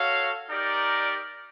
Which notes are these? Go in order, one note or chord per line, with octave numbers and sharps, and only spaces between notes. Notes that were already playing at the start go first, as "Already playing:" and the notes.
Already playing: F#4 A4 C#5 F5
D#4 G4 A#4 D5